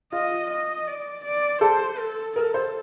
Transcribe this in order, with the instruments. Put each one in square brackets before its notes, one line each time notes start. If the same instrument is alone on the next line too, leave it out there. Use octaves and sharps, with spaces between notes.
[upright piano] F4 [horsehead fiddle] D#5
[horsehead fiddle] D#5
D5
D5
[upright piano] A4 [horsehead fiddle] C5
[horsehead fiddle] A4
[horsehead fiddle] A4 [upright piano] A#4
[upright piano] C5